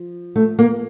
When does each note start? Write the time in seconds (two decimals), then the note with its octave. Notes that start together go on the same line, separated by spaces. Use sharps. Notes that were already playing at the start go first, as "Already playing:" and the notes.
Already playing: F3
0.36 A3
0.59 A#3